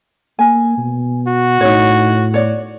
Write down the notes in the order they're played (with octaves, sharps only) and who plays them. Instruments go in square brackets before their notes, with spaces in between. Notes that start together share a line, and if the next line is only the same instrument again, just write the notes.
[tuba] A#3 [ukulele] G#5
[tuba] B2
[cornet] F#4
[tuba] A2 [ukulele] D#4 C#5
[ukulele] C#5 D5